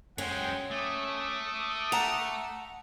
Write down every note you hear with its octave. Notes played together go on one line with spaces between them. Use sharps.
F#2 G#3 C#4 C5 F#5 G5
A3 D6 D#6
F#5 A5 A#5